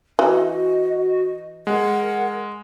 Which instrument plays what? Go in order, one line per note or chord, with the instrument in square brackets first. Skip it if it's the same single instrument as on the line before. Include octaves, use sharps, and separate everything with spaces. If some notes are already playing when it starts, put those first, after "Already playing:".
[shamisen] E3 [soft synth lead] F#4 [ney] D#5
[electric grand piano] G#3 [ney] A#4 [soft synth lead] F#5